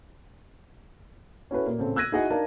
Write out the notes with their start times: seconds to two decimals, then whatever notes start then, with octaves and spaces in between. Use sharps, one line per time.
1.51 C#4 E4 F#4 A4 B4
1.66 A#2 A#3
1.79 A1 C#3 C4 A4
1.96 E6 F#6 G#6 A#6 D#7
2.12 D#4 E4 F#4 G#4 D#5 F#5
2.30 D4 D#4 A#4 D5 F5 A5